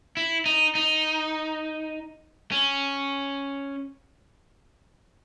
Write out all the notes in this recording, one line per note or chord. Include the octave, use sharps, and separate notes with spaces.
E4
D#4
D#4
C#4